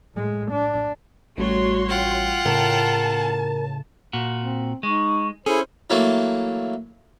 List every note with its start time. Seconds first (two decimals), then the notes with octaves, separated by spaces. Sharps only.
0.15 A2 G#3
0.51 D4
1.38 A1 G3 A3 F#4 C#5 C6
1.89 F4 F#5 G5
2.46 A2 C#3 A#4 A5
4.13 A#2 F#4
4.41 C4
4.83 G#3 D#4 C#6
5.46 C#4 E4 G#4 A4 C5 G#5
5.90 E3 F#3 A3 A#3